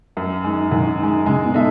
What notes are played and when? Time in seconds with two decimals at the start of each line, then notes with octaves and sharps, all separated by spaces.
0.17 F#2
0.44 D#3 G#3
0.71 F#2 D#3
0.99 D#3 G#3
1.26 C#3 G#3
1.45 B2
1.54 D#4 A4 E5